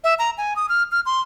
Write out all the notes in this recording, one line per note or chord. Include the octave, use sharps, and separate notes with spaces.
E5
A#5
G#5
D#6
F6
F6
C6